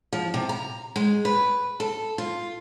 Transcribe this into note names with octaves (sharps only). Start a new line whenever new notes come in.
F3
C3
A#5
G#3
B4
A4
F4